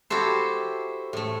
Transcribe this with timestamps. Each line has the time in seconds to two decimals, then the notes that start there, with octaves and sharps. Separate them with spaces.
0.10 E4 F#4 G4 A4 C5
1.13 A2 A3